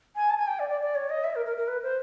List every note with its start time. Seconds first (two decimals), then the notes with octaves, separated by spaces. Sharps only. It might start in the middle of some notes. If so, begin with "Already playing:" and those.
0.16 G#5
0.30 A5
0.37 G#5
0.47 G5
0.59 D5
0.70 D5
0.81 D5
0.95 C#5
1.09 D#5
1.24 E5
1.35 A#4
1.46 A#4
1.57 A#4
1.68 B4
1.83 C5